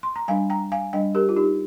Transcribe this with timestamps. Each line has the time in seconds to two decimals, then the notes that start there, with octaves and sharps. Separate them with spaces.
0.03 C6
0.16 A#5
0.28 G3 D4 F5 G#5
0.50 G5 A#5
0.72 F5 G#5
0.93 G3 D4 D#5 G5
1.15 G4 A#4
1.29 F4
1.36 D#4 G4